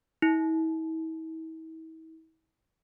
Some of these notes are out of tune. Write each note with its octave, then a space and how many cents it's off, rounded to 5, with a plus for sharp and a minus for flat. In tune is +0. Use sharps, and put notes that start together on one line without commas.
E4 -40